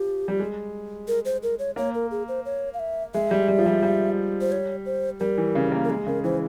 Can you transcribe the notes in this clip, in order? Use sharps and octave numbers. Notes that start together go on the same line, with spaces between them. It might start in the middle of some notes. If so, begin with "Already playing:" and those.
Already playing: F3 G4
G3
G#3
A#4
C5
A#4
C#5
A#3 C#5
A#4
G#4
C5
C#5
F5
E5
G#3 E5
G3
G3
F3
G3
G3
C5
C#5
C5
G3 A#4
E3
C#3
A#3
A#4
G#3 G#4
C#3 A#4
E3 C5